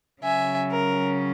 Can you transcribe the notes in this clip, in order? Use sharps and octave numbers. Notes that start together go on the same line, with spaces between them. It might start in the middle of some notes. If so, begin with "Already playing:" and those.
C#3 F#3 C#4 E5 G#5
A#4